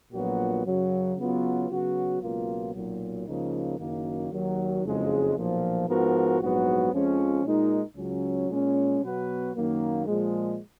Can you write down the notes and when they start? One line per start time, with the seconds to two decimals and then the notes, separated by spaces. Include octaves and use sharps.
0.13 A#1 A#2 F#3 B3 F#4
0.66 F#2 C#3 F#3
1.17 C#3 F#3 B3 F4
1.70 C#3 F#3 B3 F#4
2.22 C#2 B2 F#3 A#3 F4
2.74 B1 A#2 F#3
3.26 C#2 C#3 F3 A#3 D#4
3.79 F#1 F#2 D#3 F#3 A#3
4.32 D#2 D#3 F#3
4.84 F#1 F2 C#3 G#3
5.36 B1 A#2 F3
5.88 G#2 F3 B3 F#4 A#4
6.40 A#1 G#2 F#3 B3 F#4
6.93 F2 F3 G#3 C#4
7.44 A#2 G#3 D#4 A#4
7.97 C#2 C#3 F#3 C#4
8.50 A#2 G#3 C#4
9.02 B2 F#3 B3 F#4 B4
9.54 F#2 D#3 F#3 A#3
10.06 A#2 F3 G#3